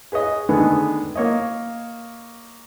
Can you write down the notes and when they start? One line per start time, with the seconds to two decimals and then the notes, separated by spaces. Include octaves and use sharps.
0.12 G#4 B4 C#5 D#5
0.49 D3 D#3 G#3 A3 B3
1.16 A#3 C#5 D#5